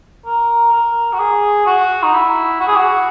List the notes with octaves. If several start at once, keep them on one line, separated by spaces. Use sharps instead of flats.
A#4
A#4
F#4
G#4
F#4
D#4
E4
F#4
G#4
F#4